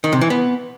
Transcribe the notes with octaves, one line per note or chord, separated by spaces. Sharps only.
D#3
C3
E3
B3